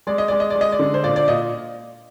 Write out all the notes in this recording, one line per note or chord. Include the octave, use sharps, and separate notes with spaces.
G#3 D5
D#5
G#3 D5
D#5
D5
G#3
D#5
D5
D3
C5
A#2 D5
D5
A#2 D#5